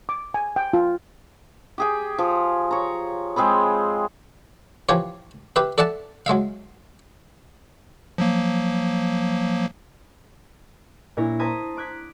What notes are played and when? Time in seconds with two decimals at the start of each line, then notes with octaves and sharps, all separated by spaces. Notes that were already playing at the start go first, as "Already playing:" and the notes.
0.09 D6
0.34 G#5
0.56 G5
0.73 F4
1.78 G4 G#4 G5
2.19 F3
2.71 C#5 A#5
3.36 G#3 C4 G#4 B5
4.89 E3 F3 G4 C#5
5.56 G4 B4 E5
5.78 A4 D5 E5 F#5 A5
6.26 F#3 G#3 E5 F5
8.18 F3 F#3 A#3
11.17 A#2 D4 E4 C#5 A#6
11.39 C5 A5 A#5 D#6 G#6 B6
11.77 D6 F#6 G#6 B6